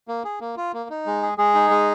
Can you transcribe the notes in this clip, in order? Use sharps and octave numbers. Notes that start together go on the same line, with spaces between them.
A#3
G#4
A#3
F4
A#3
D#4
G#3
G#4
G#3 G#4
D#4
G#3